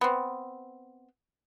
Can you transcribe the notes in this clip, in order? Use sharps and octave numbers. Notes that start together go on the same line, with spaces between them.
B3 C4